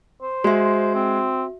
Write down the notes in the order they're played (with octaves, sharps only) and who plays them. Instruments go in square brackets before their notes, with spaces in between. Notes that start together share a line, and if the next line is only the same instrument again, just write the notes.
[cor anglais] C5
[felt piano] G#3 [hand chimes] F#4 E5
[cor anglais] C4